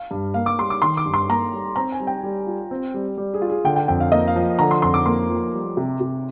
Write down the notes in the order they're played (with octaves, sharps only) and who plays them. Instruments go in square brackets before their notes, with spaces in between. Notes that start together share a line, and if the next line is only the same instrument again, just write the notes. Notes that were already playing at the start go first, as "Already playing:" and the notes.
Already playing: [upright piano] F5
[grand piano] G2
[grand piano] A#3 [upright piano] F5
[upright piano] D6
[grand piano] G3 [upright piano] C6
[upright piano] D6
[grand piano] D#3 [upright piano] C6
[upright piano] D6
[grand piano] G2
[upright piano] C6
[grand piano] A#3 [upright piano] A#5
[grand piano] G3
[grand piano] C4 [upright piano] A#5
[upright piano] G#5
[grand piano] G3
[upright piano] G5
[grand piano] G3
F4
C4
G3
G3
[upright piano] G#4
[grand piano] F4
[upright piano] G#4
[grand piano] D3 [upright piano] G5
[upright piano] G5
[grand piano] F2 [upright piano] G5
[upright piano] F5
[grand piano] A#3 [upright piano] D#5
[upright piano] F5
[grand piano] F3
[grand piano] D3 [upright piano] A#5
[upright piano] C6
[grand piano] F2 [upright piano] C6
[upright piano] D6
[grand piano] A#3 [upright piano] C6
[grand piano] F3
G3
C3
C3